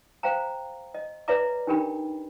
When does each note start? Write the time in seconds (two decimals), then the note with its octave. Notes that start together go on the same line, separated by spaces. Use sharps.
0.23 C5 F5 G5 A#5
0.94 D#5
1.28 B4 C#5 D5 E5 A#5 D6
1.67 D4 D#4 G4 A#4 G5 B5